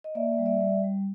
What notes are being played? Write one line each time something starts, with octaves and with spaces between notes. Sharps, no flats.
D#5
A#3 D5 E5
G3
D5 E5
G3
G3